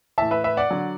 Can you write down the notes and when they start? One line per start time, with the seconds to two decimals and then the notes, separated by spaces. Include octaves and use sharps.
0.18 A2 E3 E5 A5
0.31 B4 E5
0.44 B4 E5
0.57 D5 F#5
0.71 D3 F#3